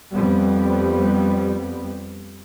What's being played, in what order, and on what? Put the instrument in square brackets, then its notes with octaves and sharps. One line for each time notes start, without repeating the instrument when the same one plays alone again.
[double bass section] F2 G3 B3